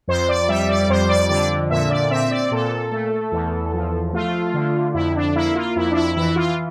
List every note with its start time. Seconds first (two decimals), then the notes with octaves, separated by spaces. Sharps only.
0.08 F2 C5
0.29 D5
0.48 G3 E5
0.69 D5
0.89 F2 C5
1.09 D5
1.29 D3 D5
1.70 A#2 E5
1.90 D5
2.10 C4 E5
2.31 D5
2.51 A#2 A4
2.91 A3
3.32 E2
3.73 F3
4.13 A3 F4
4.54 D3
4.94 F2 E4
5.15 D4
5.36 A#3 E4
5.55 F4
5.76 F2 E4
5.91 D4
5.96 E4
6.16 E3 E4
6.36 F4